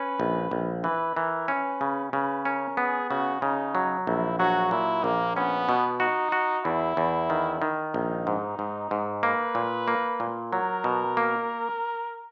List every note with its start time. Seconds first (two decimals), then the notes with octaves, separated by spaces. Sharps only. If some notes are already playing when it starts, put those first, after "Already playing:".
Already playing: C#4 B4
0.20 A#1
0.51 A#1
0.84 E3 B4
1.16 E3 A#4
1.48 C#4 B4
1.81 C#3
2.13 C#3 B4
2.45 C#4 A#4
2.77 B3 G#4
3.10 C#3 F#4
3.42 C#3 D#4
3.75 F#3
4.07 A#1 E4
4.39 F#3 F#4
4.71 A#2 E4
5.04 A#1 A#3
5.36 B3 C#4
5.69 B2
6.00 D#4 F#4
6.32 F#4
6.65 E2 E4
6.97 E2
7.30 D#3
7.62 D#3
7.94 A#1 D#4
8.27 G#2
8.59 G#2
8.91 G#2
9.23 A#3 B4
9.55 A#2
9.88 A#3
10.20 A#2
10.52 F#3 A#4
10.84 B2
11.17 A#3